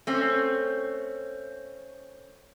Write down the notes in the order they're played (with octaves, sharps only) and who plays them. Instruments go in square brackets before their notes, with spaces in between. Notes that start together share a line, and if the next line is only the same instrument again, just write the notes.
[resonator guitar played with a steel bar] A3 C4 C#4